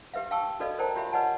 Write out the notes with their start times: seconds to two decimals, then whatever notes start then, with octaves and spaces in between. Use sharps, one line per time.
0.14 G4 B4 E5 F5
0.31 F5 G5 A5 C#6 E6
0.60 F#4 A4 B4 D5 D#5 F5
0.78 A#4 C5 D5 G5 A5 A#5
0.96 F4 G4 C#5 E5 F5 B5
1.12 B4 C#5 D#5 F#5 G#5 A5